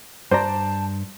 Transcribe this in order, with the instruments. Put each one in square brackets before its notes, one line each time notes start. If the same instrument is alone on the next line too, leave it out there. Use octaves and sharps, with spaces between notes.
[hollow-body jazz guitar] G2 A#5 [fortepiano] C5 D5 [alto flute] A5